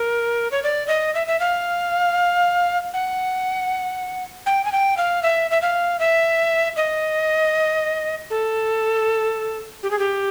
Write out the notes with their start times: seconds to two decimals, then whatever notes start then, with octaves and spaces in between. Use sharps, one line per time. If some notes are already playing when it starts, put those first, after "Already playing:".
Already playing: A#4
0.52 C#5
0.63 D5
0.88 D#5
1.15 E5
1.27 E5
1.40 F5
2.94 F#5
4.46 G5
4.65 G#5
4.72 G5
4.97 F5
5.23 E5
5.51 E5
5.62 F5
5.99 E5
6.77 D#5
8.30 A4
9.83 G4
9.91 G#4
9.99 G4